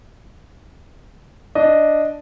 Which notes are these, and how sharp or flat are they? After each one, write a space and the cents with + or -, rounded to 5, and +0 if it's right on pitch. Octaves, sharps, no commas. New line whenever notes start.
D4 +0 D#5 +0